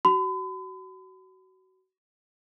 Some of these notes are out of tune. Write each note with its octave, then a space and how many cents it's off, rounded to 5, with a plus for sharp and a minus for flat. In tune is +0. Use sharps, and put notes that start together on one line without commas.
F#4 +25 B5 +40